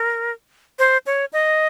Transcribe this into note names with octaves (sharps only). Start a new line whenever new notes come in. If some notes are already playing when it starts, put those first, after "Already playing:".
Already playing: A#4
C5
C#5
D#5